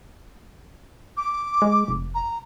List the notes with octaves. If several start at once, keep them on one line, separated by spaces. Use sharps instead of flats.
D6
G#3
F1
A#5